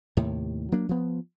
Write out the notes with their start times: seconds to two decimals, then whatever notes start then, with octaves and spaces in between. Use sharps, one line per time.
0.17 D#2 A2 C3
0.72 F#3 A#3 D4
0.89 F3 B3